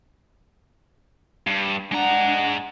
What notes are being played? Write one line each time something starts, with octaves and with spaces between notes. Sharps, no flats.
G2
G#3 D4 F#5 A#5